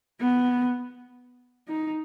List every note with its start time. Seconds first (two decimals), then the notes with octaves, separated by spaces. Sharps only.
0.21 B3
1.68 D#4